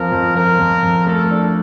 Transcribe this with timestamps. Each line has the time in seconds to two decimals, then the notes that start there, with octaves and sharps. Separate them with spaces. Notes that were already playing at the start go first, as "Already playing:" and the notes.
Already playing: F2 F3 A#4
0.12 F2
0.35 F3 A#4
0.59 F2
0.83 F2
1.07 A3 A4
1.31 D4